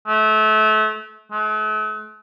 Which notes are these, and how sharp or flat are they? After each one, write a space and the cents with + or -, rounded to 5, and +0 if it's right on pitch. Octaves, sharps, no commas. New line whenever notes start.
A3 -30
A3 -45